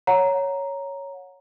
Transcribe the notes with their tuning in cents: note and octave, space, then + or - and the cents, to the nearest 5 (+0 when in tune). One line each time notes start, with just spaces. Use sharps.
C#5 +0 F#5 -25 A#5 +0